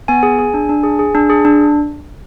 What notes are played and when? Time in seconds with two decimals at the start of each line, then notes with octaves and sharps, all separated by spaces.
0.08 B3 G#5
0.23 G#4
0.39 G#4
0.54 D4
0.69 D4
0.83 G#4
0.99 G#4
1.15 D4
1.30 G#4
1.45 D4